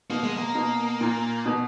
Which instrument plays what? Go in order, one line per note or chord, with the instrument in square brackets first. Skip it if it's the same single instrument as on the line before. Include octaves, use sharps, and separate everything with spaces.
[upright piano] B2 [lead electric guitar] A#3
[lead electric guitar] G#3
A#3
[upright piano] B2
A#2
B2